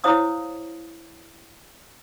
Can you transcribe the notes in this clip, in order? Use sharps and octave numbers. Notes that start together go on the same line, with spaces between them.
E4 C5 C#5 F5 D#6 E6